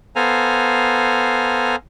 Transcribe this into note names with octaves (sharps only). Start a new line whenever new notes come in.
B3 A4 C5 F5 G#5 A#5